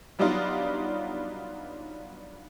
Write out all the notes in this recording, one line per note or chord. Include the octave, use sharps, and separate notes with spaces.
F#3 G3 B3 D4 D#4 F4